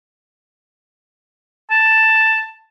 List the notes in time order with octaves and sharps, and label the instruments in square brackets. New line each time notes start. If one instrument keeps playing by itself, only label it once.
[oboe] A5